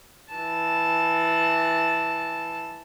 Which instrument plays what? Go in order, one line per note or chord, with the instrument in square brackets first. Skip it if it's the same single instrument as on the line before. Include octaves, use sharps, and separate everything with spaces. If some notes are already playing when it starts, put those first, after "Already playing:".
[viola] E3 A5